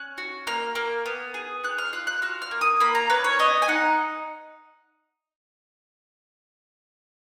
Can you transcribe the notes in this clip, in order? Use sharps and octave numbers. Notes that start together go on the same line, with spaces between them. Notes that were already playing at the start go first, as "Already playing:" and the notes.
Already playing: C#4 F#6
F#4
A#3 F6
A#3
B3
G#4
B3 F#6
F6
F4 F#6
F#6
F#4 F6
F6
A#3
D#6
A#3 B5
A#5
C#4 B4
C#5
B3 D#5
G#5
D#4 F#5